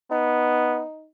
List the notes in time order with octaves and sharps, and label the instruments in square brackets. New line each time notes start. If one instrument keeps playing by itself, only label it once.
[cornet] B3 [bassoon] D#4